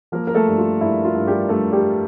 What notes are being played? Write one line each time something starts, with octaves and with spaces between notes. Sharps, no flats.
F3 A#3 A#4
A#4
A3 A4
G2
F4
G2 E4
F4
G2
G3 G4
G2 A3 A4
G3 G4